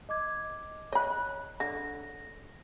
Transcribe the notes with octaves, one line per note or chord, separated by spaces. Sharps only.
D#5 D6 G#6
C#5 D#5 B5 F#6
D3 A#6